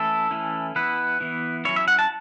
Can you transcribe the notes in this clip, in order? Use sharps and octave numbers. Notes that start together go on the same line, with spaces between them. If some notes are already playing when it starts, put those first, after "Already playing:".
Already playing: E3 A3 C#4 E4 A4
E3 A3 C#4 E4
E3 B3 E4 B4
E3 B3 E4
F#3 C#4 E4 C#5
E5
F#5
A5